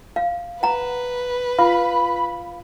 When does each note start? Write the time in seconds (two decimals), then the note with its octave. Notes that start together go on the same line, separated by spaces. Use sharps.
0.16 F5
0.63 B4 F#5 A#5
1.59 F4 F5 B5